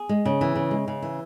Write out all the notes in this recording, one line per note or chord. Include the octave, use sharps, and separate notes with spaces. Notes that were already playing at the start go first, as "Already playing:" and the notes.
Already playing: G#4
G#3
C#3
E3
C#3
G#3
C#3
E3